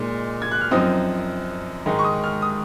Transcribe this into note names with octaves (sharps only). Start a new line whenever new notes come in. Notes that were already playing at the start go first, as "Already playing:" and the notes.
Already playing: A#2 G#3 D#4
G#6
F#6
F6
F#2 F3 C4 D#4 D#6
G#2 D#3 G#3 D#4
C#6
D#6
F6
D#6